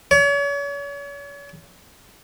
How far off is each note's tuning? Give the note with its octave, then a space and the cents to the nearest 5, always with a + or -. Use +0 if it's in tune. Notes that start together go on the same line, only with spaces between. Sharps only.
C#5 +40